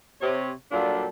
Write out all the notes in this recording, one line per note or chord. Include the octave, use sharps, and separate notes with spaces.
C3 C#5
A#2 F#3 G3 D4 F4 A4